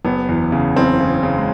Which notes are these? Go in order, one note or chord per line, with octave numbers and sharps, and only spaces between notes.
F#1 B3
E2
C#3
F#1 C4
C#3
C#3
G#3